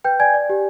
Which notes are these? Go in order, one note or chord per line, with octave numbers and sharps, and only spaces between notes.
B4 G5 G6
D5 G#5 G#6
D5
G4